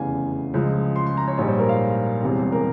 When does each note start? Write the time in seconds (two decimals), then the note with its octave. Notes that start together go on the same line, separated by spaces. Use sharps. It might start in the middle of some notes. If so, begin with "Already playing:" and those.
Already playing: F1 E2 C#3 E3 F5 G#5
0.54 C#2 C#3 F3 G#3
0.96 C6
1.07 C6
1.17 A#5
1.28 C#5
1.38 A#1 G#2 G3 C#5
1.48 C5
1.59 A#4
1.69 F5
2.22 E1 E2 C3 G3
2.52 A#4